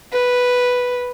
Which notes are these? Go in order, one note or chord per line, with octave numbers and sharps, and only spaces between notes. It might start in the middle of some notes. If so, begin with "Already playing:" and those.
B4